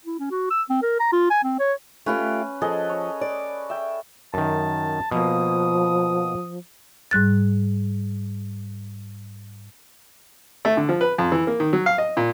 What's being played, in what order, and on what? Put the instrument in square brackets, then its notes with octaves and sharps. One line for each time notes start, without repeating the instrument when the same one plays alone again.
[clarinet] E4
C#4
F#4
E6
C4
A#4
A#5
F4
G#5
C4
C#5
[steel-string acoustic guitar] A3 F4 G4 [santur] C#4 B4
[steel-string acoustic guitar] F3 [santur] G#4 A4 D#5
[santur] C#5
[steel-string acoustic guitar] D5
[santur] E5 G5
[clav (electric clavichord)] F#2 D#3 [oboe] A5
[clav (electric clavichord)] B2 A#3 [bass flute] F3 [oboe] D#6
[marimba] G#2 G3 F#6 A6
[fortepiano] A3
D3
F3
B4
F2
E3
A#3
D#3
F#3
F5
D#5
A#2